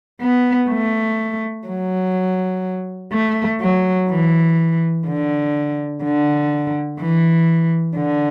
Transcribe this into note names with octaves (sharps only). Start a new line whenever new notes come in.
B3
A3
F#3
A3
F#3
E3
D3
D3
E3
D3